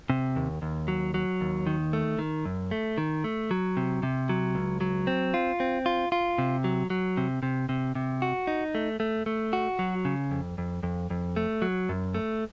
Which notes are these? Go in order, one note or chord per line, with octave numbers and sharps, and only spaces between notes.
C3
D#2
D#2
F#3
F#3
D#2
D#3
A3
D#3
F#2
A3
D#3
A3
F#3
C3
C3
F#3
C#2
F#3
C4
F4
C4
F4
F4
C3
F#3
F#3
C3
C3
C3
C3
F#4
D#4
A3
A3
A3
F#4
F#3
C#3
F2
F2
F2
F2
A3
F#3
F#2
A3